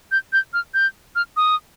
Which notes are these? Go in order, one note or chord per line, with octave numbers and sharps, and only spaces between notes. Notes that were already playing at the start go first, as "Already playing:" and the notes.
G6
G6
F6
G6
F6
D#6